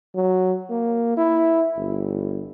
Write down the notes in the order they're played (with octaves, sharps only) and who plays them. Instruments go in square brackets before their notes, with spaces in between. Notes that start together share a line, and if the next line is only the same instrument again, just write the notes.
[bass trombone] F#3
A#3
E4
G1